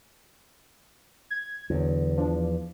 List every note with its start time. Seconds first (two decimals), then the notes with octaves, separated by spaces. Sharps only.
1.30 G#6
1.70 E2 D3 F#3
2.17 F3 D4